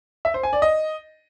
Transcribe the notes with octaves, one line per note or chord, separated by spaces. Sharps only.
E5
C5
G#5
D5
D#5